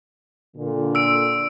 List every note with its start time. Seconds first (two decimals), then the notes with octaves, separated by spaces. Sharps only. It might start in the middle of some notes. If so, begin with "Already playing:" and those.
0.56 A#2 D3
0.95 E6 D7